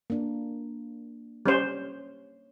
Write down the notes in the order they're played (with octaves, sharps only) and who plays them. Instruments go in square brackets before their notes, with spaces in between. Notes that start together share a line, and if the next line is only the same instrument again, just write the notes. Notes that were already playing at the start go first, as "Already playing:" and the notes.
[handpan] A#3 D4
[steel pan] G3 C#4 C5 [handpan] C#5